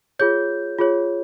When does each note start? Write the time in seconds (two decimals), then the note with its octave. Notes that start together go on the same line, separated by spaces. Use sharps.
0.19 F4 G#4 C#5 G6
0.78 F4 G#4 C#5